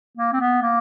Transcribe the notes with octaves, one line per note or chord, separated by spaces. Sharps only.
A#3
C4
B3
A#3